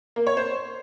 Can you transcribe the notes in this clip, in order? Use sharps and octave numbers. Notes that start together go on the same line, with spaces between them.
A#3
C#5
C5